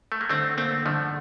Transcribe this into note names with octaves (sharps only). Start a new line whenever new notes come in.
A3
A#3
D3 A3 C4
A3 A#3 C4
D3 F3 A3